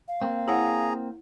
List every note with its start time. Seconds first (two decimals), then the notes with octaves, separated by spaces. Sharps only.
0.08 F5
0.22 A#3 C4
0.48 E4 G#4 C#5 F#5 A#5